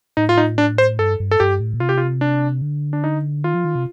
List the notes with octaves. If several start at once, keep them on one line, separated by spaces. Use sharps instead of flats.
A2 D#4
F4
D#4
D4
C5
G2 A4
G2
A4
G2 G4
A2
A#2
C3 F4
G4
F4
D4
D3
D4
D#4
D#3 F4
F3
D#3
C3